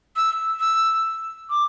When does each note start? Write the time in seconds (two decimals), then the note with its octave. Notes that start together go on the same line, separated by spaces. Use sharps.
0.16 E6
0.60 E6
1.50 D6